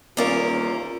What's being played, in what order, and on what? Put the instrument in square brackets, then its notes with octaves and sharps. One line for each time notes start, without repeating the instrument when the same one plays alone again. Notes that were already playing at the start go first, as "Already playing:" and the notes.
[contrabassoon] D#1 [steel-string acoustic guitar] E2 C#4 A#4 [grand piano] A#3 D5 F5 [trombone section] F4